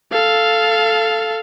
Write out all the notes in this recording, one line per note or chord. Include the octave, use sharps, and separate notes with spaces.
A4 F5